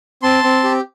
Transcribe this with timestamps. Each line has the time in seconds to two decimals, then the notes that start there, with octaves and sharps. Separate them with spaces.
0.23 C4 A5 C6
0.44 C4
0.64 G4